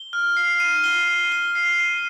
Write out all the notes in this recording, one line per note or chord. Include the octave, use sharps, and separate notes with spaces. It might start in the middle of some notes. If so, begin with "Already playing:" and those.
Already playing: G7
F6
C7
D#7
G7
D#7
G7
C7
D#7